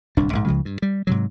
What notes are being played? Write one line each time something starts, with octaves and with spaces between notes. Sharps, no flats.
D1 C2 D4
A#1 G#2
C#2 C#3 F3 G#3
G2
G3
G#2 C3 F#3